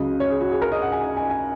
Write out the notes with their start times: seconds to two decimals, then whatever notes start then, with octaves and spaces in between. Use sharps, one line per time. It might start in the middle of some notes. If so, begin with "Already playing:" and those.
Already playing: C#2 C#3 F#3 D#5
0.20 C#5
0.30 G#4
0.41 F#4
0.51 G#4
0.62 A#4
0.72 D#5
0.82 F#5
0.92 G#5
1.02 D#5
1.17 G#5
1.30 G#5